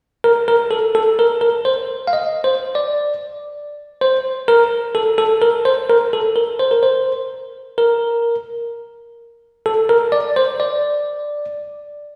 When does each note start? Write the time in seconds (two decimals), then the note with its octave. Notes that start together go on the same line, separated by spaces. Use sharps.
0.24 A#4
0.48 A#4
0.71 A4
0.95 A4
1.19 A#4
1.41 A#4
1.65 C5
2.07 F5
2.13 D#5
2.44 C5
2.75 D5
4.01 C5
4.48 A#4
4.95 A4
5.18 A4
5.42 A#4
5.65 C5
5.90 A#4
6.13 A4
6.36 A#4
6.60 C5
6.71 A#4
6.83 C5
7.78 A#4
9.66 A4
9.89 A#4
10.12 D5
10.36 C5
10.60 D5